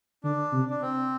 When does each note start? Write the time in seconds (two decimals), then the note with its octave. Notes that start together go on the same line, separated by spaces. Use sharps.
0.24 D3 D4
0.53 C3
0.70 D4
0.82 C4